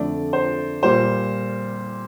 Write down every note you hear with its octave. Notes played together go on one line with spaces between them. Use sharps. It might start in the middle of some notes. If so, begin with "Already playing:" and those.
Already playing: F2 D3 A3 D5
C5
A#2 G3 A#3 C5